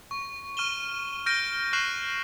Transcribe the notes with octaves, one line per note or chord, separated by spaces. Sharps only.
C#6
C#6 F6 D#7 E7 G7
F6 G6 A#6 D7 D#7
C#6 F6 F#6 C7 E7 F#7